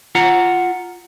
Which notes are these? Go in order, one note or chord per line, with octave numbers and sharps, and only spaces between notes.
F4 F#5 A#5